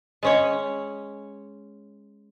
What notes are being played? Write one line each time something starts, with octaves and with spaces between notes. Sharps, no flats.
G#3 C#4 C#5